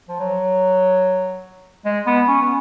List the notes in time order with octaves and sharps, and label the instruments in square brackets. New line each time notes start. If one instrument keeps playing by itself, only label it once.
[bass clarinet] F3
F#3
G#3
B3
C#4
B3